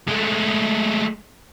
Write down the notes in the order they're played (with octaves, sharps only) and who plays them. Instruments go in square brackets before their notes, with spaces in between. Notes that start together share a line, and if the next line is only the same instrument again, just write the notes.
[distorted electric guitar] G#3 A3